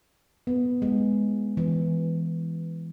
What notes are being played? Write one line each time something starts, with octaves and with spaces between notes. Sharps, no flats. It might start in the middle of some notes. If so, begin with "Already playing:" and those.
B3
G#3
E3